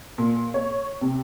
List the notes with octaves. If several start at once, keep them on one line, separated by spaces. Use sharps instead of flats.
A#2
C#5
C3